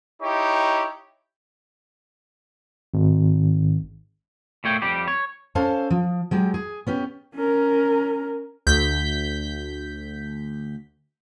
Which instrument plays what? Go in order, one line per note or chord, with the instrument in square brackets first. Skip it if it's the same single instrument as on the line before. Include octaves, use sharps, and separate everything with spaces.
[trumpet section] D#4 E4 G4 C#5
[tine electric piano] G#1
[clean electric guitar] A#2 A3 C#5 G5
F2 G3 G4
C#5
[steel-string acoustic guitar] C#4 A4 C5 F5 A5
F3
F#3 G#3 G4
G#4
B3 C#4 G4
[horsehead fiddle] C#4 A#4
[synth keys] D2 G6 B6